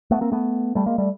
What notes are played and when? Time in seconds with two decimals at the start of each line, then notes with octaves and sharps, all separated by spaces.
0.11 A3 B3
0.21 A#3 C4
0.32 A3 B3
0.75 G3 A3
0.86 G#3 A#3
0.98 G3 A3